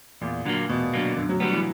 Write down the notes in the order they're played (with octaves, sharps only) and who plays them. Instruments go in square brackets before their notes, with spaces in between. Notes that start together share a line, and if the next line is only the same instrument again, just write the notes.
[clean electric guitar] E2 [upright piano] A#2
[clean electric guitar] D3 F#3 A#3
[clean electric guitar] E2 [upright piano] B2
[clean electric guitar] D3 F#3 A#3
[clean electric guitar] F#2 [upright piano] D3
[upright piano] F#3
[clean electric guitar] D3 G3 B3 [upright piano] F#3
[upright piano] E3